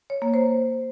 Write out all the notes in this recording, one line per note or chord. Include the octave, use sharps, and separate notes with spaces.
C#5
A#3
C5